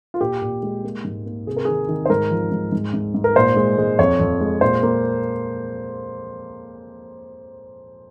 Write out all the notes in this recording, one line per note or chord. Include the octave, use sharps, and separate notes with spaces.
F4
A#2 G4
A#2
G#3
A#3
G#2
A#3
C3 G#4
A#4
D#3 G#4
D#3
C5
G#2 A#4
F3
G#2
G#2
G#2
G#2
A#4
A#2 C5
G#3
G#3
F2 C#5
F2
G#3
A#2 C5
A#3